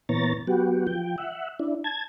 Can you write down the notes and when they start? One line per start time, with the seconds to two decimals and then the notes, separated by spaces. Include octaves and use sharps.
0.09 A#2 E3 B3 C#5 A#5 A6
0.47 F#3 B3 F#4 G4
0.87 F3 G5
1.18 E5 F#5
1.60 D4 E4
1.84 A5 G#6